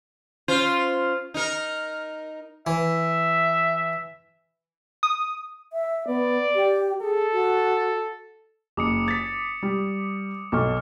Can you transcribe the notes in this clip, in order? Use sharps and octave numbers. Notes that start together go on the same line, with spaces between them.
C#4 F4 C5
D#4 A#4
E3 E5
D#6
E5
B3 D5
G4
G#4 A4
F#4
F#1 D6 D#6 C#7
A6 B6
G3
B1 A4 C#6 D6 F6